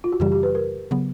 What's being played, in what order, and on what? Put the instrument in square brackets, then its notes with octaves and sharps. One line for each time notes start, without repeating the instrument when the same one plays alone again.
[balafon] F4
F#4
[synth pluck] F#2 C#3 E3 G3 [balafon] G4
[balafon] G4
B4
A#4
[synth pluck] C#3 F#3 B3